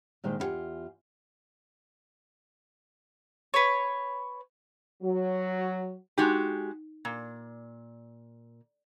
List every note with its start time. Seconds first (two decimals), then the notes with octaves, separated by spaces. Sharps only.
0.24 A#2 D#3 G#3 C5 F5
0.39 E2 E4 F4 G4 F#5 G#5
3.54 B4 C#5
5.03 F#3
6.18 G#3 D#4 F#4 G4
7.05 A#2